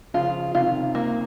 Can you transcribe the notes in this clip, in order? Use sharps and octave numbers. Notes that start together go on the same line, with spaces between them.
C#3 F3 F4
C3 D#3 F4
A#3